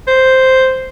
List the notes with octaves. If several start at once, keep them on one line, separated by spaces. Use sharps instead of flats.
C5